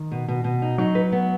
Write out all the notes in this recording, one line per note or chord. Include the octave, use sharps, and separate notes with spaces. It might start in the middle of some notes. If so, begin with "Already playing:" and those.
Already playing: D#3
B2
B2
B2
D#4
F#3 D#4
B4
B3